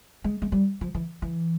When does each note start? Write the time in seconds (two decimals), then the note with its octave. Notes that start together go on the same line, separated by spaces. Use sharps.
0.24 G#3
0.42 G#3
0.52 G3
0.81 F3
0.95 E3
1.22 E3